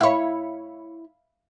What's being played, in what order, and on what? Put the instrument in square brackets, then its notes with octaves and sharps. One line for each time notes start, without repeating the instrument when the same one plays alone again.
[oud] E4 C#5 [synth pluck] E5 F5 B5